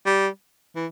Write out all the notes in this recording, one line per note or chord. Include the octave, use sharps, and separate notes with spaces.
G3
E3